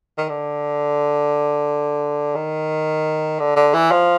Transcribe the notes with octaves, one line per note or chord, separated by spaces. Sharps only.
D#3
D3
D#3
D3
D3
E3
F3